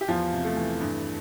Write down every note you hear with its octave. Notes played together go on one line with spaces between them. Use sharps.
G4
E2 F3 F4
C3
A3
E3
G2